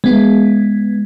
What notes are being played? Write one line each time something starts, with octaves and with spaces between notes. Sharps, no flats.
G#3 B3